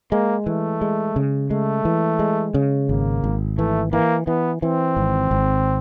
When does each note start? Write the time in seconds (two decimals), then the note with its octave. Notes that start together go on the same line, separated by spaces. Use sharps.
0.12 G#3 A#3
0.46 E3 A3
0.81 G#3
1.16 C#3
1.50 G#3 A3
1.85 E3
2.19 G#3
2.54 C#3
2.89 G#1 A#3
3.24 G#1
3.58 E3 A3
3.93 E3 A#3
4.27 E3 B3
4.62 E3 C4
4.97 G#1
5.31 G#1